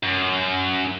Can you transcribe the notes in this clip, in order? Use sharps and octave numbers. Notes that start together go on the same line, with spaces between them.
F#2